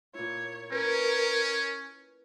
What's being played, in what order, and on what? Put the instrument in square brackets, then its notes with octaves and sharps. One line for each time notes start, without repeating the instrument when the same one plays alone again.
[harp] A#2 E4 [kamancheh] C#5
[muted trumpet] C#4 [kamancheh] A#4 [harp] B4